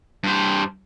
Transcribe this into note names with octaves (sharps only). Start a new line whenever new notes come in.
G2 C5